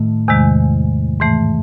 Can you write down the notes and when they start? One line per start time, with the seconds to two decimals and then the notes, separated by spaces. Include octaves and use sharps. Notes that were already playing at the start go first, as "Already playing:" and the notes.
Already playing: A2 D#3 A3
0.28 E2 C3 D#3 G#3
1.20 G#2 E3 A3